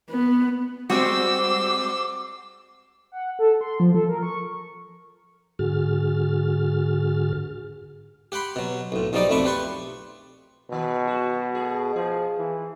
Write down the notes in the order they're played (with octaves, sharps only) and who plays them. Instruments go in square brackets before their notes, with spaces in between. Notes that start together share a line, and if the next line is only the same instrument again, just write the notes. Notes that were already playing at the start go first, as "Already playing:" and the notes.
[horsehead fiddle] B3
[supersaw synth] G3 G#3 C4 [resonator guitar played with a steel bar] F#4 [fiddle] C5 E6 [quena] D6
[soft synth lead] F#5
A4
C6
F3
A4
A#4
C#6
[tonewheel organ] G#2 D3 F#4 G#4 F6 A6
[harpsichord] G4 F#5 G5 B5 C6
B2 F#3
B1 A2
B1 F3 G3 D#4 D5 D6
B1 F2 A3 B5 C#6 D6
G4 B4 C6 C#6
[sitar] G#2 D#3 [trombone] B2
[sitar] F#3 F#4
A3 G#4
[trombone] F3 [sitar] G#4
[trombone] E3